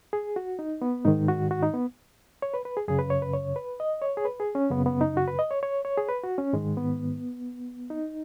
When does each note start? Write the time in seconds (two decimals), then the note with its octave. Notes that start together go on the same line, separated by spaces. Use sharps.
0.13 G#4
0.36 F#4
0.59 D#4
0.82 B3
1.05 G#2 D#3 D#4
1.28 F#4
1.51 F#4
1.63 D#4
1.74 B3
2.42 C#5
2.54 B4
2.65 B4
2.77 G#4
2.88 F#2 C#3 G#4
2.99 B4
3.10 C#5
3.22 B4
3.33 C#5
3.56 B4
3.80 D#5
4.02 C#5
4.17 G#4
4.25 B4
4.40 G#4
4.55 C#4
4.70 F#2 C#3 B3
4.86 B3
5.01 D#4
5.17 F#4
5.28 B4
5.39 D#5
5.51 C#5
5.63 C#5
5.85 C#5
5.97 G#4
6.09 B4
6.23 F#4
6.38 C#4
6.53 G#2 D#3 G#3
6.77 B3
7.90 D#4